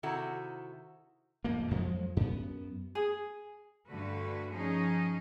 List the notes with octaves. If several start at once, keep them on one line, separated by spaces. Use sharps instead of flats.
C3 D#3 E4 F#4 A4
D1 F2 F3 A#3
F2 F3 F#3 G#3
F#2 B3
G#4
G2 D3 A3 F#4 B4
F3 C#4 D#4 G#4